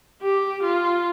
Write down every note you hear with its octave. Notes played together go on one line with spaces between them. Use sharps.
G4
F4